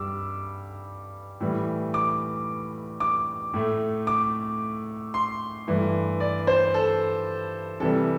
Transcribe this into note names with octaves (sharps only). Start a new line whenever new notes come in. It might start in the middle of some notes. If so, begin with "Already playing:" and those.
Already playing: G2 G3 D6 E6
A2 E3 G3
D6
D6
A2 A3
D6
C6
G2 E3 A3
D5
C5
A4
C3 E3 G3 A4